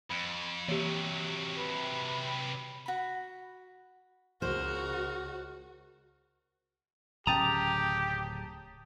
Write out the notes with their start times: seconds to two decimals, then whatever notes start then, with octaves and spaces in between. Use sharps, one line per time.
0.10 F2 B5
0.68 C3 E3 F#3 G4
1.57 B4
2.86 F#4 B5
4.42 C#2 F#4 A#4 C5
7.27 D1 C#3 G4 G5 A5 A#5 D#6